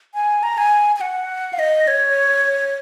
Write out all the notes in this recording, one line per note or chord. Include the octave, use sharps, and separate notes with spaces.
G#5
A#5
G#5
G#5
F#5
F5
D#5
C#5